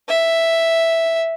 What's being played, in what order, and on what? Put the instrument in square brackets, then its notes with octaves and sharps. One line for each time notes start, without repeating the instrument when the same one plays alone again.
[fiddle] E5